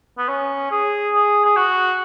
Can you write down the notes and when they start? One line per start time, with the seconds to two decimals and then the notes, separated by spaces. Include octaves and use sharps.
0.18 B3
0.29 C#4
0.71 G#4
1.14 G#4
1.45 G#4
1.56 F#4